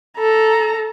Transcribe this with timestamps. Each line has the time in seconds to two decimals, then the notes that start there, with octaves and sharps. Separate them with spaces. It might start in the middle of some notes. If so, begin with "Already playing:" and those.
0.19 A4 A#5